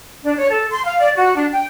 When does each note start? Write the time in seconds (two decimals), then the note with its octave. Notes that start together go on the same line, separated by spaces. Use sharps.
0.24 D4
0.37 C#5
0.49 A4
0.70 C6
0.85 F5
0.99 D5
1.15 F#4
1.35 D4
1.52 G5